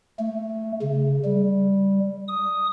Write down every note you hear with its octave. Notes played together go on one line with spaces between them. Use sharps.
A3
C#3
G3
D#6